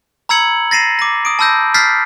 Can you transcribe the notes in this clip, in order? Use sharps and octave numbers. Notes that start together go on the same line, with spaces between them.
A#5 B5 E6 G#6 C#7 F#7
A6 A#6 C7 D#7 E7
D6 A#6
D#6 D7
A5 B5 E6 G6 A#6
E6 F6 G6 A6 B6 C7